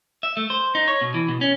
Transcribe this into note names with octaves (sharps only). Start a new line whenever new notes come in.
E5
A3
C5
D#4
C#5
B2
E3
B2
C#4